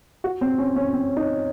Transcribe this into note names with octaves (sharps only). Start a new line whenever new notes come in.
F#4
C4
C#4
C#4
C4
D#4